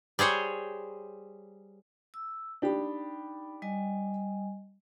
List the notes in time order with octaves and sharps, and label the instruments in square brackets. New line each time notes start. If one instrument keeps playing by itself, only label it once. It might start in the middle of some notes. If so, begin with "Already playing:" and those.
[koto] G3 G#4 C5 C#5
[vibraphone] E6
[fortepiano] D4 G4 [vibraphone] D#4 B5
[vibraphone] G3 D#5 G#5